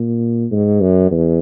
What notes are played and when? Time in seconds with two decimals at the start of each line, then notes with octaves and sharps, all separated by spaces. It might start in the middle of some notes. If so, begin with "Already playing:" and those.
Already playing: A#2
0.51 G#2
0.81 F#2
1.11 E2